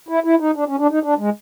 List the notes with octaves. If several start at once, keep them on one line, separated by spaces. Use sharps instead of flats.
E4
E4
D#4
D4
C#4
D4
D#4
D4
G#3